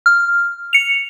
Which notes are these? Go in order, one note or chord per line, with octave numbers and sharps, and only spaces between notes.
F6
C#7 F7